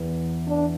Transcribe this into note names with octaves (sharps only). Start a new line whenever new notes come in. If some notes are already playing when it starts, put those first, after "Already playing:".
Already playing: E2 E3
D4